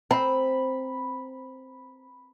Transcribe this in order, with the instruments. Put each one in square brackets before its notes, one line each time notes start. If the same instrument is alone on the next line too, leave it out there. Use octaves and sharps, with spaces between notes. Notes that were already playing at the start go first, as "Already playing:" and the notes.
[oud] C4 [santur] B5